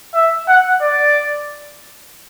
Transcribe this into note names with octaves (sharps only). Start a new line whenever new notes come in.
E5
F#5
D5